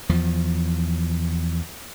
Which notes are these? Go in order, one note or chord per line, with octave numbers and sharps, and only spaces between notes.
E2 F3